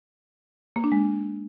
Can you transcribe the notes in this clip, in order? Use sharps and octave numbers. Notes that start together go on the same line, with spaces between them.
A#3
D4
G#3